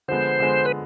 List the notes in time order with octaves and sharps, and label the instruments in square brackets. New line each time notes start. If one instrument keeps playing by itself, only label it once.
[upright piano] D3 F3 G#3 B3 [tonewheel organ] C5
[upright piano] D3 F3 G#3 B3
[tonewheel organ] B4